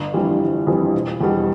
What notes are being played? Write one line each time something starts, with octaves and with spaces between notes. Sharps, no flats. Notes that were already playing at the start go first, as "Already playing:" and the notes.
Already playing: G1
F2 E3 G3
G1
F2 E3 G3
E1
E2 B2 G3